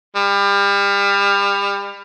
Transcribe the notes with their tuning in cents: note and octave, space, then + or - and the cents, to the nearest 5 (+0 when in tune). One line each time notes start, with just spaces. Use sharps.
G3 +35